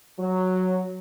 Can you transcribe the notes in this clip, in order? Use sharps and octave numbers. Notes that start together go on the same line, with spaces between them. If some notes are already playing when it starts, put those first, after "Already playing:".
F#3